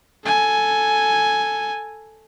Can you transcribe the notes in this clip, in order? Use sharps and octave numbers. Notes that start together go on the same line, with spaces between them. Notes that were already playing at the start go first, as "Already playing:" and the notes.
A4 G#5